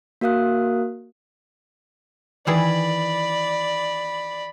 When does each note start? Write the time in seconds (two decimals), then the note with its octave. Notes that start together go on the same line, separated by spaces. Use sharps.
0.21 A#3 F#4 A#4 F5 D#6 F#6
2.47 D#3 E3 G#4 D5 B5